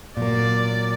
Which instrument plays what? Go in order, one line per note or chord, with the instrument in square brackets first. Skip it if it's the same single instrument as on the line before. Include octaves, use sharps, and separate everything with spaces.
[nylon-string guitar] A#2 F#3 A#3 [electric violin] D5